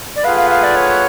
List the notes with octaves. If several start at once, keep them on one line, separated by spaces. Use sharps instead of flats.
D5
A3 F4 G#4 B4 F5 F#5
F5
F5
D5
C#5